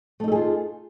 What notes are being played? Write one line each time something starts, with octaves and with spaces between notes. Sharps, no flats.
A3 D#4 F4 G#4 A4